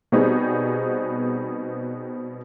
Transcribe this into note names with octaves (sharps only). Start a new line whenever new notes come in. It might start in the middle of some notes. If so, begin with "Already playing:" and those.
B2 G3 B3 C4 D#4 G#4